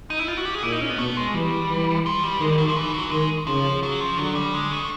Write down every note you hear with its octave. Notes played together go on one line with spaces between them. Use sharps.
D#4
E4
F4
F#4
G4
G#4
A#2 E4
D#4
C#4
B3
B2 A3
G#3
E3 G3
E3
F3
G3
D#3 G#3
G3
F#3
F3
E3
F#3
D#3 G#3
C#3 F3
F#3
F3
D3 F#3
G3
G#3
A3